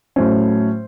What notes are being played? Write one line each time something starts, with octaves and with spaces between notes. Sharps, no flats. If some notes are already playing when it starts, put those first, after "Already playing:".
A2 F#3 A3 C#4 C5